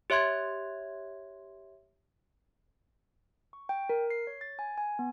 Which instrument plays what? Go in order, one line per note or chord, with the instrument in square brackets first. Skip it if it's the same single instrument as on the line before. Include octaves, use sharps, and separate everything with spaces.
[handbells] G4 C#5 E5 C6 G#6
C#6
G5
A#4
C7
C#5
A6
G#5
G#5
B3